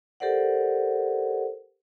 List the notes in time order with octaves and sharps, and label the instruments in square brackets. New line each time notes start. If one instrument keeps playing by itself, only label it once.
[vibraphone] G4 A4 A#4 C5 D5 F#5